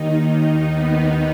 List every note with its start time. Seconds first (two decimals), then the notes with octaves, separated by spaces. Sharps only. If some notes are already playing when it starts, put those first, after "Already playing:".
Already playing: D#2 D#3 D#4
0.32 D#4
0.74 B3